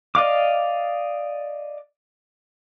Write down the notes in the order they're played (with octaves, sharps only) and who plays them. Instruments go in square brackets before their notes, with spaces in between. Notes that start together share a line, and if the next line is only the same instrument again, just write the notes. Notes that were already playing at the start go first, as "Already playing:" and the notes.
[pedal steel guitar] D5 D#5 F5 D6